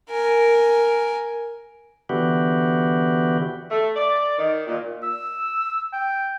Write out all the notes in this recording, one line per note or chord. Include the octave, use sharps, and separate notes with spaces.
A#4 G#5
D3 E3 B3 F#4 G4
A3
D5
D#3
A#2
E6
G5